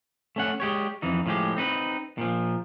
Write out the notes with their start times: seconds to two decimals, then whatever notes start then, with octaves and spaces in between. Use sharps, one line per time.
0.36 A3 C#4 F#5
0.60 G#3 G4 C#5
1.02 F2 E3 D#4
1.26 A2 F3 G#3 G4
1.57 C4 D#4 B4
2.18 A#2 F3